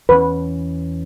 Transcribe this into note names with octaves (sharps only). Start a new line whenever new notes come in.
E2 E3 G#3 C#4 B4